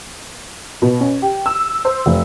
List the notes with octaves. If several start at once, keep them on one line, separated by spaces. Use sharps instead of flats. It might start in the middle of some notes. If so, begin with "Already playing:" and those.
B2
C#4
G4
E6
C5
F1